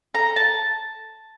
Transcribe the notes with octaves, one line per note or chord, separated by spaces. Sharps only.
A4 A#5
A5